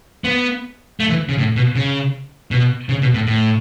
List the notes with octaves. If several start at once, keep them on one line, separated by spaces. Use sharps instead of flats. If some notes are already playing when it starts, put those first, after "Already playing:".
B3
A3
E3
C#3
A2
B2
C#3
B2
C#3
B2
A2
A2